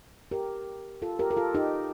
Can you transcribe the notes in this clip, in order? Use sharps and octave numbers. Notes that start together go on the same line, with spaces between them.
G4 A#4
F4 A4
G4 A#4
A#4
F4 A4
D#4 G4